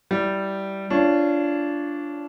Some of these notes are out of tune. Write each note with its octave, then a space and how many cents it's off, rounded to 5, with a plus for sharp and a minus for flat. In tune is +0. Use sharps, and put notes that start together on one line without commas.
G3 -10 E4 +0
D4 -15 F4 -25 C#5 +0